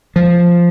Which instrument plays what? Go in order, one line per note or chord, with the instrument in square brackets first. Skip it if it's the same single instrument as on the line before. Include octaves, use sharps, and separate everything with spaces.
[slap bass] F3